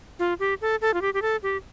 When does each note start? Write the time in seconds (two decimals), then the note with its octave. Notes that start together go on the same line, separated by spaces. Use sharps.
0.19 F4
0.40 G4
0.61 A4
0.81 A4
0.94 F4
1.02 G4
1.14 G4
1.22 A4
1.43 G4